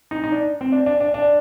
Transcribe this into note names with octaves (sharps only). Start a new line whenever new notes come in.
D#4
D#4
D4
C4
D4
D4
D4
D4